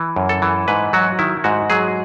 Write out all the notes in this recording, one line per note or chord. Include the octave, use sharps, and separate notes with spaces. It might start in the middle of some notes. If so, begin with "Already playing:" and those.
Already playing: E3
F#2
A4
E3
G#2 B4
F#3 F#4
D#3 E4
G#2 F#4
F#3 G#4